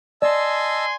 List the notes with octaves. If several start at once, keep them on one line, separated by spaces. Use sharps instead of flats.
D5 D#5 G#5 A5 C6 E6